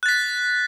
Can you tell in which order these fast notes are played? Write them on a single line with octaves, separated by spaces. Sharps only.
F#6 A6 B6